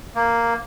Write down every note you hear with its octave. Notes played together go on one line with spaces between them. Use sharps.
A#3